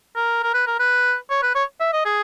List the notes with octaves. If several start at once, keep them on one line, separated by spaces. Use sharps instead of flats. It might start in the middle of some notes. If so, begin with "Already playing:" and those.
A#4
A#4
B4
A#4
B4
C#5
B4
C#5
E5
D#5
G#4